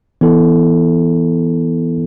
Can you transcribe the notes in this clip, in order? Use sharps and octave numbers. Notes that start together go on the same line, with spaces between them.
E3 B3 E4 A4